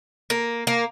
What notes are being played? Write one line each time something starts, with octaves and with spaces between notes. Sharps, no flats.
A#3
A#3